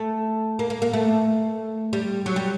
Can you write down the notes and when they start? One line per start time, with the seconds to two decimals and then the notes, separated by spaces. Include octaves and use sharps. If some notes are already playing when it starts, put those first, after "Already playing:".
Already playing: A3
0.59 A#3
0.70 A#3
0.82 A#3
0.93 A3
1.93 G3
2.26 F#3
2.36 G3